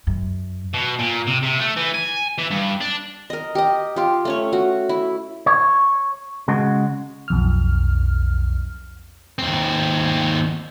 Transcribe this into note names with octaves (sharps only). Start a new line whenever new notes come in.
F#2
B2
A#2
C3
C3
A3
E3
G#5
E3
G2
D4
A#4 D#5
G4 D#5
F4 G4
A3 C#4 C#5
F#4
E4
C#5
C#3 G#3 F#4
B1 F2 F6
D#2 C4